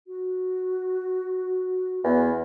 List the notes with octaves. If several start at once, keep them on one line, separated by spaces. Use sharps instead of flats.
F#4
E2 B3